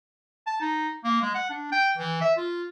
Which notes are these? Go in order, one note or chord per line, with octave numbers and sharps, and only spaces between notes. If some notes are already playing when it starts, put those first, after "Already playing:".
A5
D#4
A#3
G#3
F#5
D4
G5
E3
E5
F4